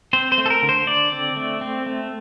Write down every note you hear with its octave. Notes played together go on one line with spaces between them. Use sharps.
C4 C5
C5
A3
A4
A#4
D3
C5
D3 D5
C4
A3
C4
A3